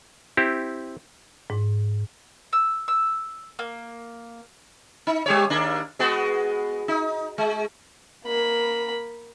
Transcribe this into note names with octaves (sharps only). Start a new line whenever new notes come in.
C4 E4 G4
G#2
E6
E6
A#3
D#4
G3 G4 C#5
D#2 A#3 D4
G#3 B3 F#4
D#4
G#3
A#3 B5